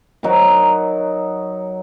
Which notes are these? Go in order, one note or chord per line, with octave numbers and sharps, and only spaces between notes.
F#3 D#4 A#4